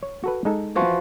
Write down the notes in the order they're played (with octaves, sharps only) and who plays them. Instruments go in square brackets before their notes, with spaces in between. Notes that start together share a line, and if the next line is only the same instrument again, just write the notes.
[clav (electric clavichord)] C#5
F#4 A4 B4
G#3 D#4 A4
[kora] E3 F3 F#4